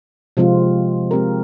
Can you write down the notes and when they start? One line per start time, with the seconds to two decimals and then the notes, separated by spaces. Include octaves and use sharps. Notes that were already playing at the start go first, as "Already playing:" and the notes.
0.37 C3 F3 G#3 C4 F4
1.11 G#3 C4 G4 A#4